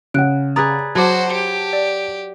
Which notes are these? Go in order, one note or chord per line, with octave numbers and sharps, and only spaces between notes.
C#3 F#5 F#6 D7
G#4 B4 D5 A#5 D#6 A6
F#3 F#4 C5 A5 D6
G4 C#7
D5